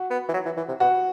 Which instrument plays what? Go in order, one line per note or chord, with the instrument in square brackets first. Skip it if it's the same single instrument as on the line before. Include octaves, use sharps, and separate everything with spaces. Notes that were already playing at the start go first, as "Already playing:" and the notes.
Already playing: [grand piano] F#4
[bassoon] B3
E3
F#3
E3
E3
C3
[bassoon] B2 [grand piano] F#4